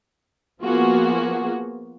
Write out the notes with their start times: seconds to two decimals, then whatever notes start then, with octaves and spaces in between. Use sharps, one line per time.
0.62 F3 A#3 B3 F4 F#4 G#4